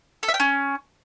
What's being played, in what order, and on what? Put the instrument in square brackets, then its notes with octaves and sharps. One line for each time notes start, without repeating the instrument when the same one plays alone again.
[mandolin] A4
E5
G5
C#4